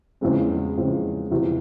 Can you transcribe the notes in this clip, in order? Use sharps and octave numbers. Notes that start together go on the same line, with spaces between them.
E2 C#3 F3 G#3 C4
E2 C#3 F3 G#3 C4
E2 C3 F3